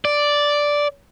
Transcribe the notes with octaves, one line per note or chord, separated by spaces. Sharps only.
D5